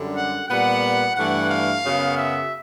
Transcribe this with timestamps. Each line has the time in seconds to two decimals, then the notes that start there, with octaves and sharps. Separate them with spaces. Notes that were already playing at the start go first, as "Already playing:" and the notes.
Already playing: F#2 D3 G3
0.14 F#5
0.47 A#2 G3 B3 F#5
1.15 G2 E3 A3 F#5
1.49 F5
1.83 F#2 C#3 F#3 B3
2.17 E5